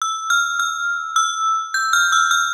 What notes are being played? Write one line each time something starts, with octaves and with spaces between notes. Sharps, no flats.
E6
F6
F6
E6
G6
F6
E6
F6